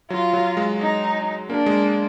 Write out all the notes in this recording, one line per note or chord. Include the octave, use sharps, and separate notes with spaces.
F#3 F4
F#3
G#3
D#4
A#3 D4
G#3